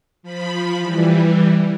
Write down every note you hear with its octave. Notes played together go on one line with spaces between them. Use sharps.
F3 B5
E3 G3